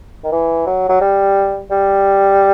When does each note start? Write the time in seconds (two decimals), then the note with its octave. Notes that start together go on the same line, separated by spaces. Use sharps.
0.23 D#3
0.32 E3
0.66 F#3
0.89 F#3
1.01 G3
1.70 G3